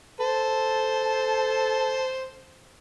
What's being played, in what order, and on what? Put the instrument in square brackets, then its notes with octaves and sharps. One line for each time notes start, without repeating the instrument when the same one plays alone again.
[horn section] A4 A5 [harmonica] C5